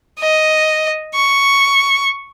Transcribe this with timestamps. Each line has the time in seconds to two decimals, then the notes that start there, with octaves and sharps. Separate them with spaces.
0.19 D#5
1.15 C#6